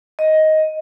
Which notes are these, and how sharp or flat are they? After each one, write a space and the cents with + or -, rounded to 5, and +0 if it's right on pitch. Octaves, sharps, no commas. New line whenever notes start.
D#5 +10